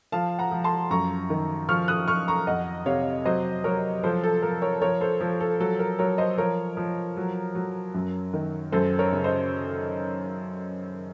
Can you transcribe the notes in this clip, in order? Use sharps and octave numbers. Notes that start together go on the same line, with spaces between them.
F3 F5 A5
F#5 A#5
F3
A5 C6
F#2 A#5 C#6
D#3
F3 C#6 F6
D#6 F#6
F3 C#6 F6
A#5 C#6
F2 D#5 F#5
C3 C#5 F5
F#3 C5 D#5
F#3 A#4 C#5
F3 A4 C5
A4
F3 A#4
A#4 C#5
F3 A#4 C#5
A4 C5
F3 A4
A4
F#3 A4
A#4
F#3 A#4 C#5
C5 D#5
F3 A#4 C#5
F3
F#3
F#3
F#2
D#3
F#2 A4 C5
A#4 C#5
C#3
C5 D#5